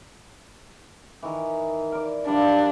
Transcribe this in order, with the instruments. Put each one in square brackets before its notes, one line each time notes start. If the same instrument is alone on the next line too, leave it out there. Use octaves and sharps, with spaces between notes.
[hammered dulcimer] D#3 E3
A#4 D5
[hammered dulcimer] F3 G3 [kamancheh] D4